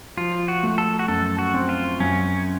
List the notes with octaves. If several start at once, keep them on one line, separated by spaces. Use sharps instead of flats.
F3 F4
F#4
A3
A4
F#4
F#2 A4
F#4
C4
F4
F#2 C#4